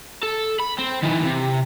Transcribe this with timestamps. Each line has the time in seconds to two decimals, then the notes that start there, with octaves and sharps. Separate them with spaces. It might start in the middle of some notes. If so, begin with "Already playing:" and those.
0.23 A4
0.60 B5
0.79 C4
1.03 D#3 E3
1.26 C3